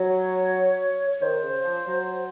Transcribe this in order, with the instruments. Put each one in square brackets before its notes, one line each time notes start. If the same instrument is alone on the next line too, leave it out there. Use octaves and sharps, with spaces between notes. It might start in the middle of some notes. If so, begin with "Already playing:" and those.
Already playing: [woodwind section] F#3 [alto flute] C#5
[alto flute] C#5
[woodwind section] D#3 [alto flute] C5
[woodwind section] C#3
F3
F#3